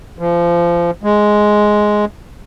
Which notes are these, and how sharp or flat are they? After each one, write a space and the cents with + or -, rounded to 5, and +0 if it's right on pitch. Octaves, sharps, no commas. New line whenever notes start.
F3 -25
G#3 +5